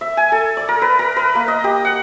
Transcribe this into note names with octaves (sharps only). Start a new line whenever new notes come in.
E5
G#5
A4
D5
A#4
B4
A#4
B4
A#3
D#5
G4
F#5